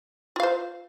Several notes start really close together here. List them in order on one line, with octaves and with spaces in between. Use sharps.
F4 F5 C5